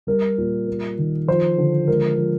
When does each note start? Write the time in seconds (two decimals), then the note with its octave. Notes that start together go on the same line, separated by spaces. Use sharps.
0.07 G3 A#4
0.38 A#2
0.67 A#3
0.98 D#3
1.28 F3 C5
1.58 D3
1.88 G#3 A#4
2.18 F3